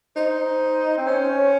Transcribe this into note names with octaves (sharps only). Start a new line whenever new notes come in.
D#4 C5
C4
C#4 C5
C#5